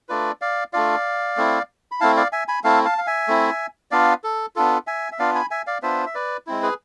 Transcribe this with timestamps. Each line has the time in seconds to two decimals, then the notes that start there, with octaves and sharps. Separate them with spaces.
0.09 A3 D4 F4 B4 D5
0.41 D5 F5
0.73 A3 D4 F4 D5 F5
1.37 A3 C4 E4
1.92 B5
2.00 A3 C4 E4 F5 A5
2.17 D5 F5
2.32 E5 G#5
2.48 G#5 B5
2.64 A3 C4 E4 F5 A5
2.85 F5 A5
2.98 F5
3.07 E5 G#5
3.28 A3 C4 E4
3.91 B3 D4 F4 D5 F5
4.24 A4
4.56 B3 D4 F4 A4
4.87 E5 G#5
5.12 E5
5.19 B3 D4 F4 D5 F5
5.35 G#5 B5
5.51 E5 G#5
5.67 D5 F5
5.82 B3 D4 F4 C5 E5
6.06 E5
6.15 B4 D5
6.47 G#3 C4 E4
6.63 G#4 B4